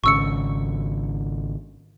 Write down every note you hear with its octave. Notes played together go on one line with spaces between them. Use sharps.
G#1 C#3 C#6 E6 C#7